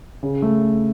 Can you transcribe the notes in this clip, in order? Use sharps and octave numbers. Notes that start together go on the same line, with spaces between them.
C#3
A3